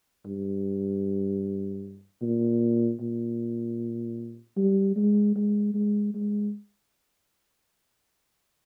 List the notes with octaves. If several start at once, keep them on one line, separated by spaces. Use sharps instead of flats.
G2
A#2
A#2
G3
G#3
G#3
G#3
G#3